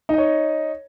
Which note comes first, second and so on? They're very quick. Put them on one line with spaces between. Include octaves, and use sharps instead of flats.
D#4 D#5 C#5